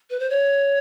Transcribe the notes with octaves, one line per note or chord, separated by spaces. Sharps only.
B4
C5
C#5